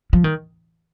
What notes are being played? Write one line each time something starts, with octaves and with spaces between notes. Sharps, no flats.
F3
D#3